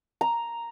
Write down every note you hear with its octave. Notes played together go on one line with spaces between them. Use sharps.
A#5